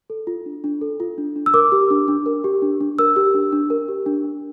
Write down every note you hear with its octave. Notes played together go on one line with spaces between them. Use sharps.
A4
F4
D4
D4
A4
F4
D4
D4
E6
A#4 D6
G4
D4
D4
A#4
G4
D4
D4
A#4 E6
G4
D4
D4
A#4
G4
D4
D4